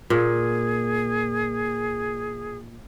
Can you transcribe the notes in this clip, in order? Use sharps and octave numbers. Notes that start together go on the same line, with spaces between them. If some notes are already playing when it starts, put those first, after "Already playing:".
A#2 G#4